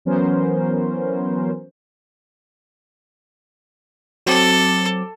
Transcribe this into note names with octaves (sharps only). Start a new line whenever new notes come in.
E3 F#3 B3 C#4 A#4 C5
F#3 C4 A4 D6